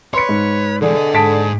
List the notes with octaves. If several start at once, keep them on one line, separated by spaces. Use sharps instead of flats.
B4 C#5 C6 C#7
G#2
D3 E3 G#3 G#4
B4 D#5
G#2 G#4 A5 B6 D7